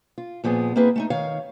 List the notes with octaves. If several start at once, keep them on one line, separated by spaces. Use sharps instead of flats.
F4
A#2 F3 B3 G#4
A#3 C4 E4 G#4 B4
A3 C#4 D#4
D#3 C#5 F5